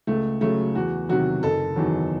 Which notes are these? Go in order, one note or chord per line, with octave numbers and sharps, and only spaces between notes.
C#2 A3
C#3 F#3 A3
E2 F#4
C3 D#3 F#3 F#4
F#1 A4
E2 D#3 F#3